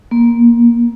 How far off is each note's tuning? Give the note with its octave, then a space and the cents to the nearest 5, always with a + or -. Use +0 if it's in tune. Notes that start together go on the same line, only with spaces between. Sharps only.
A#3 +15